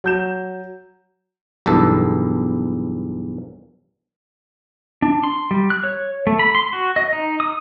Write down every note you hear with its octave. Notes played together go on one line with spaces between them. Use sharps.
F#3 G6 E7
B1 E2 G2 A4
D4
C6
G3
F#6
C#5
A3
B5
C6
F#4
D#5
D#4
D#6